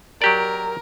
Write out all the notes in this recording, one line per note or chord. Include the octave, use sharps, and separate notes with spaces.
F#3 G4 A#4 D5